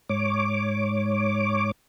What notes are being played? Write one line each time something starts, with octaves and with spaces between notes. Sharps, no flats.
G#2 C#5 D6